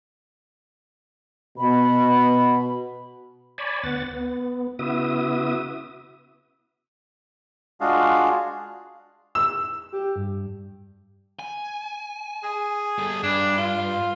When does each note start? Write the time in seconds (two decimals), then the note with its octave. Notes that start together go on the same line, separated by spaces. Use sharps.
1.58 B2 B5
3.58 C#5 D5 G#5 A5 B5
3.83 D2 B3 F#5 A6
4.14 B3
4.79 C#3 B3 E4 F#4 E5 D#6
7.81 G#3 D4 F4 F#4 G#4 F5
9.35 E6
9.92 G4
10.16 G2
11.39 G#5
12.43 G#4
12.98 G3 A4
13.23 G2 D4
13.57 F4